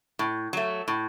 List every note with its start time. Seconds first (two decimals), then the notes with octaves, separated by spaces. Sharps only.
0.19 A2
0.53 F#3 A3
0.88 A2